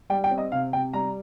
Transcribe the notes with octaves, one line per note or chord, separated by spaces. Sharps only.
G3 G5
G5
C4
D#5
C3 F5
C3 G5
G3 A#5